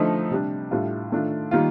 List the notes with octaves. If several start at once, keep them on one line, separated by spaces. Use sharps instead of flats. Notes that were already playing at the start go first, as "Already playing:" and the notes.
Already playing: D3 F3 A3 D#4
C3 G3 D4
A2 G3 D4 F4
D#3 A3 D4 F4
D#3 G3 A#3 F4